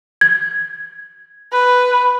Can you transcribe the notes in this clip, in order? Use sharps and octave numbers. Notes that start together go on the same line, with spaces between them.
G#6
B4